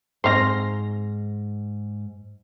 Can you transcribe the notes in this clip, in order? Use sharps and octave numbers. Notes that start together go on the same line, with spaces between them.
G#2 C4 D#4 C5 C6 F6 A#6